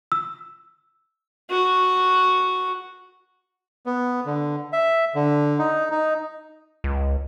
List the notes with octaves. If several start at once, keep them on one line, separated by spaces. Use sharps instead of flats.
E6
F#4
B3
D3
E5
D3
D#4
D#4
C#2